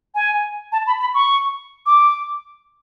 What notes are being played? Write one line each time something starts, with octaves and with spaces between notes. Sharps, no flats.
G#5
A5
B5
B5
C#6
D6